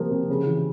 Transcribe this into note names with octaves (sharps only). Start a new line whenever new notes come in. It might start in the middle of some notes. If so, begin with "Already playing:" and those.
Already playing: C3 F3 A#3
C3
C#3
E3